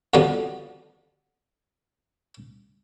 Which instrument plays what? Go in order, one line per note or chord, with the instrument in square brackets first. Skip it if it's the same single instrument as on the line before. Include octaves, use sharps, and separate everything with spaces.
[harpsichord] F2 D3 D#3 F#3 G3 B3